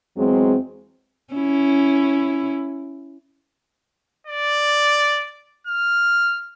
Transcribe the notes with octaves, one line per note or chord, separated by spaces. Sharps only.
E2 F#3 G#3 C4
C#4 E4
D5
F6